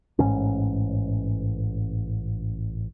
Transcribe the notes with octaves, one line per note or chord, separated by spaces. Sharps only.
A1 G#2 B2 C#4